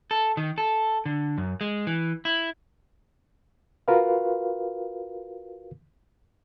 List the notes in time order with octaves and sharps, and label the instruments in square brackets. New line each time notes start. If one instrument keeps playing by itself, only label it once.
[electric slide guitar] A4
D#3
A4
D3
F#2
G#3
E3
E4
[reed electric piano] F4 F#4 A#4 B4 F5